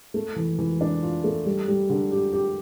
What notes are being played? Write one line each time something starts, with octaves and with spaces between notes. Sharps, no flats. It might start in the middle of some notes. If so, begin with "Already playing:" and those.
A3
E3
E3
D4
F4
A3
G3
G3
D3
G4
G4